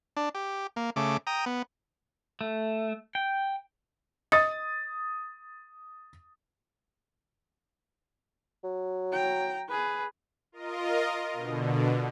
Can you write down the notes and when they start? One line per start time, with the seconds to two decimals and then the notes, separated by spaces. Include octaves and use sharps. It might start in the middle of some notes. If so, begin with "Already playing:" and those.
0.17 D4
0.35 G4
0.76 A#3
0.96 C#3 A3 D6
1.27 G5 A#5 D#6
1.46 B3
2.41 A3
3.15 G5
4.32 D#5 D#6 A6
8.64 F#3
9.12 G5 A#5
9.69 G#4 B4
10.52 F4 A#4 D#5
11.33 B2 D3